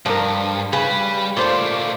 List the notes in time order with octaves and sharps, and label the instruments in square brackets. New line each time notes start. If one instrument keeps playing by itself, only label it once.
[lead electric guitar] G2 [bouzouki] F3 [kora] D4 A#4
[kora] C#3 [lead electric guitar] G3 [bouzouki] B4
[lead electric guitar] A#2 A3 [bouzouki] A#3 D4 [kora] F4 C5